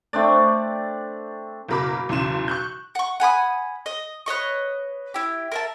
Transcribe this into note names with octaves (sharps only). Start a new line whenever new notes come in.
A3 C4 D4 D5
F#1 B2 A#4 B5 D6
B1 E2 C#3 C6 E7
C#6 F#6 G6
F#5 C#6
F#5 G#5 B5 D#6
D#5
B4 C#5 D#5 C#6
E4 G4
A#4 E5 A5